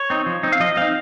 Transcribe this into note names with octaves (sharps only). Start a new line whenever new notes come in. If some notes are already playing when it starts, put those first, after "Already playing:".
Already playing: C#5
C4 D#4
F3
C4 D#4
F5
F3 D#5
C4 D#4 F5